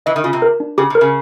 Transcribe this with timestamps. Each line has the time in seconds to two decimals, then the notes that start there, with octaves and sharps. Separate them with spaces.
0.06 E3 D#5
0.16 D#3
0.24 C#3 F4
0.33 C3
0.42 A#4
0.60 D4
0.78 C#3 G4
0.90 C3
0.95 A#4
1.01 C#3